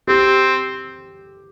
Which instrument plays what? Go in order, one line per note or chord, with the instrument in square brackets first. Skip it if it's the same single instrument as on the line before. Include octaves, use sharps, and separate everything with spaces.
[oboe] C4 [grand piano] G4